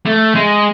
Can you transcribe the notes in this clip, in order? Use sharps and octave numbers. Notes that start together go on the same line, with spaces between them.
A3
G#3